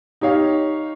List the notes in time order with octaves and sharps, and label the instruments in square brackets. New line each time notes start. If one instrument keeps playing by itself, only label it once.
[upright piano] D#4 G4 C#5 F5